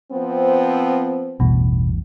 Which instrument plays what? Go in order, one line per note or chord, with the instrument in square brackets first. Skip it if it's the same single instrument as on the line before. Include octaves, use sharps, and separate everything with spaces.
[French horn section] F3 B3 C4
[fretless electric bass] A1 E2 G2 [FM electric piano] B2